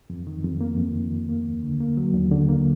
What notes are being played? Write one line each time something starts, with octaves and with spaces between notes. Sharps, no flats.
F2
D#3
F2
A#3
F2
D#3
F2
A#3
D#2
D3
A#3
F#3
D#2
D3
A#3